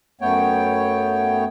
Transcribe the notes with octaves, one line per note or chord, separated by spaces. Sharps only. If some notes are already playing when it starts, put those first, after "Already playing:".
F#2 A3 B3 C#5 G5